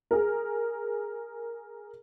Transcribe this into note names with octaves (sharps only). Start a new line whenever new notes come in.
G#4 A#4